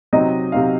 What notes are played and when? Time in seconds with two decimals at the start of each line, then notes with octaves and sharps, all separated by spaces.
0.13 C3 F#3 C4 D#4 D#5
0.52 C3 F#3 C4 D#4 F5